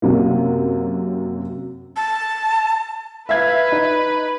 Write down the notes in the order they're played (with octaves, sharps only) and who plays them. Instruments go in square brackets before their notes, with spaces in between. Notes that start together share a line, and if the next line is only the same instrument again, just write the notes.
[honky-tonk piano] F#2 C3 F#3 A#3
[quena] A5
[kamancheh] B4 [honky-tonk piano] E5 F5 G#6
[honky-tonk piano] D#4